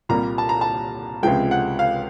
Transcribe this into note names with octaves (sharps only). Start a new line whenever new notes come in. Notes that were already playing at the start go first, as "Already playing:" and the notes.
C2 A#2 G3 A#3 A#5
A5
A#5
A5
C#2 C3 F3 G#3 G5
F#5
F5